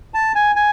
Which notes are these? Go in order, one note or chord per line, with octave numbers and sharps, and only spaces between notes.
A5
G#5
G#5